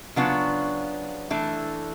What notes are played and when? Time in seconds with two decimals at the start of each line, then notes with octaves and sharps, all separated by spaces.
0.16 C#3 F#3 B3 D4 F4
1.31 E3 A3 D4